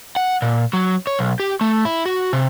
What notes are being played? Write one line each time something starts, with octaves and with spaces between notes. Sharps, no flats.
F#5
A#2
F#3
C#5
B1
G4
A3
E4
F#4
C3